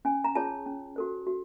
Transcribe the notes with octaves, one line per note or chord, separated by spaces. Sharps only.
C#4 G#5
A#5
F4 G#4 C#5 A5
C#4
F#4 A4 C5
F#4